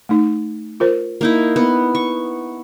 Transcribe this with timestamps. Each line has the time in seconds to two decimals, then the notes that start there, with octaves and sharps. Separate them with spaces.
0.09 A3 D#4
0.80 F4 A#4 C5
1.21 A#3 D#4 E4
1.56 B3
1.95 C#6